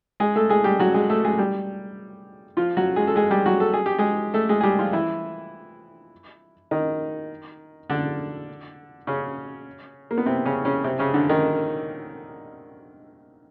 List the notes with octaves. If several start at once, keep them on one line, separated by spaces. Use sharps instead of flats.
G#3 G#4
A3 A4
G#3 G#4
G3 G4
F#3 F#4
G#3 G#4
A3 A4
G#3 G#4
G3 G4
F3 F4
F#3 F#4
G#3 G#4
A4
G#3 G#4
G3 G4
F#3 F#4
A4
G#4
G4
G#3 G#4
A3 A4
G#3 G#4
G#4
G3 G4
F3 F4
E3 E4
D#3 D#4
D3 D4
C#3 C#4
A#3
B3
C3 C4
C#3 C#4
C#3 C#4
C3 C4
C#3 C#4
D3 D4
D#3 D#4